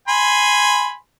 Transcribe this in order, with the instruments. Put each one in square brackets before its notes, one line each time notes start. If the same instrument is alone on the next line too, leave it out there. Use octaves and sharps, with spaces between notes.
[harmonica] G#5 B5 C6